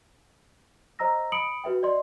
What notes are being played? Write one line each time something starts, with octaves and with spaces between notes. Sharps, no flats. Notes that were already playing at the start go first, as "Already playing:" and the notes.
C5 D#5 A#5 E6 A#6
B5 D#6 C#7 D7 F#7
F#4 B4 E5 G5
D5 D#5 C6